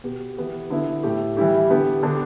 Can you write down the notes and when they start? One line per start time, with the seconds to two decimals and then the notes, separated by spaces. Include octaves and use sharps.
0.04 B2 B3 G4
0.37 E3 B3 G4
0.70 D3 B3 E4
1.03 A2 A3 G4
1.37 E3 G3 E4 G4
1.70 D3 B3 G4
2.03 D3 B3 D4 G4